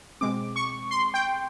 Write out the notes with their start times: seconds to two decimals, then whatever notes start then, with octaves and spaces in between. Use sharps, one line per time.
0.21 B2 G#3 C4 D6
0.56 C#6
0.91 C6
1.14 G5